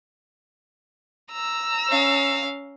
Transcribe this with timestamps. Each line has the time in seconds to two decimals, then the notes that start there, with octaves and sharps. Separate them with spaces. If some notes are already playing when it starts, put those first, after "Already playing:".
1.32 A#5 E6
1.89 C#4 F5